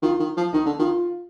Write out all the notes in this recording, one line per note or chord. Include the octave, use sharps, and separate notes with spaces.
D#3 F4
D#3
F3
D#3 D#4
D3
D#3 F4